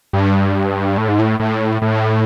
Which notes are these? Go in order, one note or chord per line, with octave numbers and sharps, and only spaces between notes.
G2
A2
G#2
A2
A2
A2